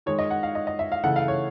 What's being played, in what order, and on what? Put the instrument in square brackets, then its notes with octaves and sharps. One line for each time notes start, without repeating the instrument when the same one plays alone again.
[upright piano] D#3 G#3 C#5
D#5
F#5
F5
D#5
D#5
E5
F5
C#3 E3 A3 F#5
F5
C#5